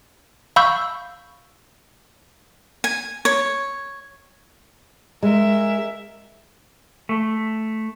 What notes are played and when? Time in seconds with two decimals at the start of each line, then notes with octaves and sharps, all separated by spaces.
0.56 F5 B5 C#6 E6 G6
2.84 G#5
3.25 C#5
5.23 G#3 A#4 E5
7.09 A3